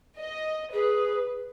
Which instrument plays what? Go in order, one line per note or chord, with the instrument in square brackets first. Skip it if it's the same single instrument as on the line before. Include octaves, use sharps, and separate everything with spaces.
[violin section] D#5
[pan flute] G#4 [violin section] B4